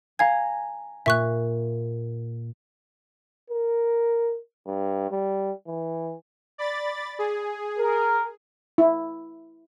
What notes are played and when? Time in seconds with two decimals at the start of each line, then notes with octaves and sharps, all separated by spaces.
0.19 F5 G#5 A#5 G#6
1.06 A#2 E5 C#6 F#6
3.50 A#4
4.67 G2
5.11 G3
5.67 E3
6.58 D5 B5 A6
7.19 G#4
7.79 A#4
8.78 E4